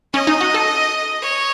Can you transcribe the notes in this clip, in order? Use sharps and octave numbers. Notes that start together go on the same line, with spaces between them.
C#4 D#5
D#4
F#4
A4
C#5